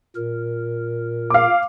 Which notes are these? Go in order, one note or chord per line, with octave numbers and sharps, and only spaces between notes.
A#2 A#4
F5 D6